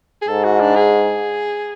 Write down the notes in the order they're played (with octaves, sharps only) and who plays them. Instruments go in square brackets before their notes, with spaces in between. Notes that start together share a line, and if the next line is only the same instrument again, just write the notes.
[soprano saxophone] G#4
[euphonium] G#2 [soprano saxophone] A4
[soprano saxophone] F#4
D4
G#4